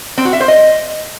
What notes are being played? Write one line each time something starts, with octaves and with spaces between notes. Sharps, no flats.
C4
F#4
E5
C5
D#5